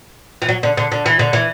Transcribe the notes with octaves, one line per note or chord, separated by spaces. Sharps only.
E3
F#3
D3
D3
D3
E3
D3
E3